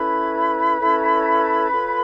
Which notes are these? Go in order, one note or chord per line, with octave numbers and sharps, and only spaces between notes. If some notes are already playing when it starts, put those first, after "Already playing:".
Already playing: C#4 E4 A4 B4 C#5 B5
C#4 E4 A4 C#5
F4 A4 C#5